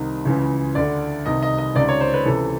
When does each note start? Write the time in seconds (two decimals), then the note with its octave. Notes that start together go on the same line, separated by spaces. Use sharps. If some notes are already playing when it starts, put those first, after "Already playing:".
Already playing: C2 C3 D#3
0.25 C#2 C#3 E3
0.75 D2 D3 D5
1.25 C2 C3 D#3 D#5
1.42 D#5
1.58 D#5
1.75 C#2 C3 D#3 D5
1.88 C#5
2.01 C5
2.14 B4
2.26 C#2 C3 E3 A4